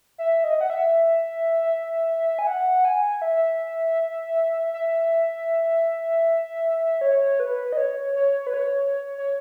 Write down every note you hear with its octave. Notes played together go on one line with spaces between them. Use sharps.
E5
D#5
F#5
E5
G#5
F#5
G#5
E5
E5
C#5
B4
D#5
C#5
C#5
B4
C#5
C#5